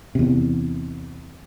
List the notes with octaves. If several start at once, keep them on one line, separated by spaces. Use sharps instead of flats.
E2 C3